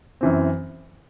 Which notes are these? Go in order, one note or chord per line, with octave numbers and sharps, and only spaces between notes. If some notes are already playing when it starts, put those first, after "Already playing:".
F#2 E3 C4